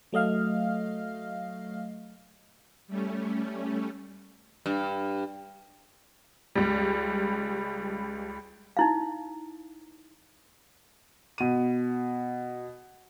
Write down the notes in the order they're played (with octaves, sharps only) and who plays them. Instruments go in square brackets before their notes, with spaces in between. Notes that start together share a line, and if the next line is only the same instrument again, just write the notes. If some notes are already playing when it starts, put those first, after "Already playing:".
[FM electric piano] F#3 A3 D#5 F5 F6
[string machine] G3 A3 C#4
[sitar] G2
[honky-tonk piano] C#2 G3
[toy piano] D#4 E4 F5
[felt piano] B2 D#7